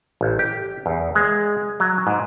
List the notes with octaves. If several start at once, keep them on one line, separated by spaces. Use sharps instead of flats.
A1
G4
E2
G#3
F#3
G#2